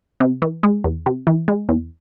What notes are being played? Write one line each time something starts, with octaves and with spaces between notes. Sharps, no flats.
C3
E3
G#3
E2
C3
E3
G#3
E2